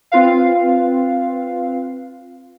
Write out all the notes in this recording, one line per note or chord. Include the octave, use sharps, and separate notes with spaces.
C4 F4 B4 F5